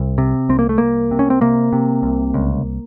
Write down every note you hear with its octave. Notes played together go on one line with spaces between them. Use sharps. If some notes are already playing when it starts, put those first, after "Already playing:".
Already playing: C2
C3
C2 C4
A#3
A3
C2 A#3
C3
C#4
C4
C3 A#3
C3
C2
C#2